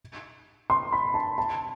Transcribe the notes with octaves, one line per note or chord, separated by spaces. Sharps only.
C6
B5
A5
A5